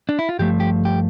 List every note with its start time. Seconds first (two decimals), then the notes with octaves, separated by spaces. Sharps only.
0.09 D4
0.19 E4
0.29 F4
0.39 G2 F3 A3 G4
0.60 G4
0.85 G4